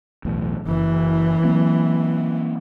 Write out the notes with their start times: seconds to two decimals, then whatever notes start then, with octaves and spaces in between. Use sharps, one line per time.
0.25 B1 E2 A2
0.67 F#1 E3
1.44 F#3 A#3 C4